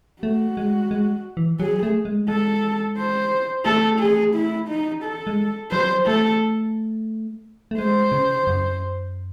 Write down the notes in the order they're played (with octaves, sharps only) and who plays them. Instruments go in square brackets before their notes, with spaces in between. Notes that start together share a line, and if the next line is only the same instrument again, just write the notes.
[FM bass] A3 [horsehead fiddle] F#4
[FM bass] G#3
G#3
E3
[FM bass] F#3 [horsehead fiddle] G#4
[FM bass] A3
G#3
[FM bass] G#3 [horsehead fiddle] A4
[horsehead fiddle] C5
[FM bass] A3 [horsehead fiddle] A4
[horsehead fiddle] G#4
E4
D#4
A4
[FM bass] G#3
[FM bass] F#3 [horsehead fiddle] C5
[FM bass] A3 [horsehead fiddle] A4
[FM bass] A3
[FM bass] G#3 [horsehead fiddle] C5
[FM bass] C#3
F#2